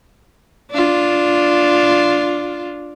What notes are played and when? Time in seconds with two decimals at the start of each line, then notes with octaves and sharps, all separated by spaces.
0.71 D4 F4